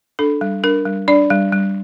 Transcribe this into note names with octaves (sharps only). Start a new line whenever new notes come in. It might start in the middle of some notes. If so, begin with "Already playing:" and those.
D4 A4
G3
D4 A#4
G3
D4 D5
G3
G3